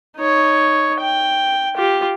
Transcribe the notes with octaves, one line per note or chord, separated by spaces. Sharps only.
D#4 C#5
G5
F4 G4